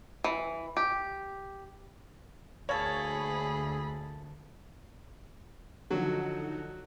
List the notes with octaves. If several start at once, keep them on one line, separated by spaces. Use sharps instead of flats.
E3
G4
D2 A#3 G#4 A4 C#5 B5
D3 D#3 F3 F#3 D#4 F#4 A4